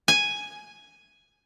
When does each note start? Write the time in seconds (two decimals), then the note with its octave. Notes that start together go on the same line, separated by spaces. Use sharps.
0.08 G#5